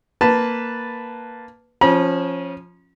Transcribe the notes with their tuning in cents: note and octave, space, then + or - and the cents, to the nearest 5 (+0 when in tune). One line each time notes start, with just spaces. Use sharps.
A#3 +0 B4 +0 A5 +0
F3 +5 C#4 -15 B5 -45